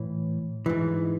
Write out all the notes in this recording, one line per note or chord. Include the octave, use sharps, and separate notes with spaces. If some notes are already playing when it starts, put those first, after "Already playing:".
Already playing: A2 E3
G#2 E3